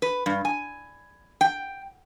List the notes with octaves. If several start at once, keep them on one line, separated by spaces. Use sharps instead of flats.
B4
G2
G#5
G5